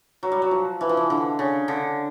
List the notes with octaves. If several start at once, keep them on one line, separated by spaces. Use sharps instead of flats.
F#3
G3
F#3
F3
E3
F3
E3
D3
C#3
D3